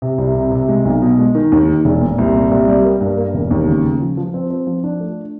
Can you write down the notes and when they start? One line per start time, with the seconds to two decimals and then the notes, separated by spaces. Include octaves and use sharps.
0.02 C3
0.18 C2
0.35 C3
0.52 C3
0.68 G#3
0.85 B1
1.02 B2
1.18 G#3
1.35 D#3
1.52 D#2
1.68 D#3
1.85 E1
2.01 A#2
2.18 C2
2.34 A#2
2.51 C2
2.68 G3
2.85 A#3
3.01 G2
3.18 A#3
3.34 E1
3.51 D#2
3.68 C#3
3.84 C#3
4.01 F3
4.17 F3
4.34 C4
4.50 C4
4.67 F3
4.84 D4
5.00 A3